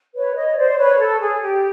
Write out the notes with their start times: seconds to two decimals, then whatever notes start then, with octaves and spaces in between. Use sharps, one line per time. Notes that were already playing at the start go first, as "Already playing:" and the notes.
0.14 B4 C#5
0.35 C#5 D#5
0.57 C5 D5
0.69 D5
0.77 B4 C#5
0.98 A4
1.19 G#4
1.40 G4